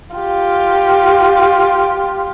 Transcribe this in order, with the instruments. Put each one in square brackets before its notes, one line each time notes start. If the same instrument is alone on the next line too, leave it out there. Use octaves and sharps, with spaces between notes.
[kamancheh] F4 G4